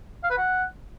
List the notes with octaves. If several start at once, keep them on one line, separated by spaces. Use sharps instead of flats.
F5
B4
F#5